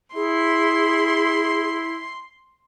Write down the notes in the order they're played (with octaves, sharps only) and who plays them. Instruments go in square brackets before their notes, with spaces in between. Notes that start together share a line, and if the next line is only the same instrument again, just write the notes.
[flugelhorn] E4 [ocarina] G#4 [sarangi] C6